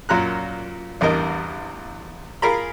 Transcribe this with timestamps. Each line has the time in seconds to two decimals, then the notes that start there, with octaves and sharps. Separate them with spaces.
0.09 F#2 A#2 A#5 F#6
1.01 A1 E2 G2 A#4 D#5
2.42 F4 G#4 A#4 A#5 B5